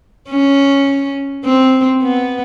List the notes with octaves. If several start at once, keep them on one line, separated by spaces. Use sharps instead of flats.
C#4
C4
B3